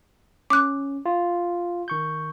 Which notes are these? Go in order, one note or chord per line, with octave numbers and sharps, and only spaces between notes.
C#4 D6 F#6
F4
D#3 C#6 G6